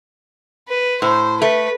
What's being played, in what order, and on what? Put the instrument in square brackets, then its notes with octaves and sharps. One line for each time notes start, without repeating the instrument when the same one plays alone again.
[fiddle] B4
[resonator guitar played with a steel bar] A2 [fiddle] C5
[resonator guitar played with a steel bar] A3 [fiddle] B4